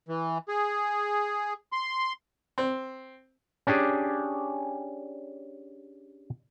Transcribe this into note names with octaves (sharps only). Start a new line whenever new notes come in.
E3
G#4
C6
C4
C#4 D4 G4 G#4